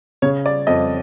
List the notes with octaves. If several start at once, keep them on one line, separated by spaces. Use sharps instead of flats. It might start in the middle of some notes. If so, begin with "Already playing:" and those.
C#3 C#5
D5
F2 D#5